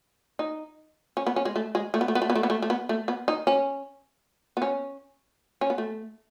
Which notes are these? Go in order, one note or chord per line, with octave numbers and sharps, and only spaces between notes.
D#4
C#4
B3
C#4
G#3
A3
G#3
A3
B3
A3
B3
A3
B3
A3
B3
A3
A3
B3
A3
B3
D#4
C#4
B3
C#4
C#4
B3
A3